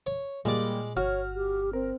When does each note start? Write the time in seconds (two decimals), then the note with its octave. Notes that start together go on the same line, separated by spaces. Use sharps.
0.06 C#5
0.45 A#2 G3 G#3 A#3 D5
0.97 G1 F#4 C#5 F6
1.35 G4
1.73 C4 A#4